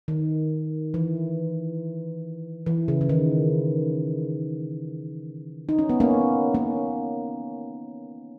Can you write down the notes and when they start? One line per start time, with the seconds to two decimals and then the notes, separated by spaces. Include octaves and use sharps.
0.08 D#3
0.94 E3
2.66 E3
2.88 C#3
3.01 C#3
3.09 D#3
5.69 D#4
5.79 C#4
5.90 B3
6.00 A#3 C#4
6.54 A#3 C#4